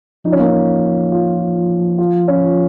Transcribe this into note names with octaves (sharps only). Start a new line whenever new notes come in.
F3 D#4
C#4
A#3
C#4
F4
F4
C#4